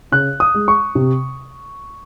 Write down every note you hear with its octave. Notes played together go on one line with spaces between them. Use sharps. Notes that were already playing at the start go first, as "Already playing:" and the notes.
C#3 F#6
D#6
G#3
C#6
C3